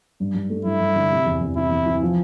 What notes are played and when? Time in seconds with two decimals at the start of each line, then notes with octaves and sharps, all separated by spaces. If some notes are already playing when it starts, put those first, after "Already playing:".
0.20 G2
0.34 G2
0.50 A3
0.65 G2 E4
0.80 G2
0.96 D3
1.11 C3
1.26 E2
1.41 E2
1.56 C3 E4
1.71 E2
1.86 E3
2.02 F3